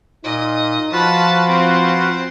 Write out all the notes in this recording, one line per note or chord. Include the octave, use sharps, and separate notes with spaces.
A#2 D#4 D#5
F3 F4 F#4 B4 A5 B5
C4 C5